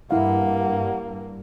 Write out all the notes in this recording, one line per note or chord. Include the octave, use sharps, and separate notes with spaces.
G2 A#3 E4 F5 F#5